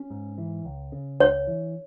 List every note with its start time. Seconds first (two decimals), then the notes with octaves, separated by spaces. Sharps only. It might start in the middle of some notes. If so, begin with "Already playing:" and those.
Already playing: C#4
0.10 G#2
0.38 E3
0.65 C#2
0.92 C#3
1.20 C#2 C#5
1.47 E3